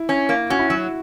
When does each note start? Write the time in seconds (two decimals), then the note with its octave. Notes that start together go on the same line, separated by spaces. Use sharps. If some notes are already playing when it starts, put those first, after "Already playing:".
Already playing: E4
0.09 C#4
0.29 A#3
0.50 C#4 F#4
0.59 E4
0.68 F#3 F#4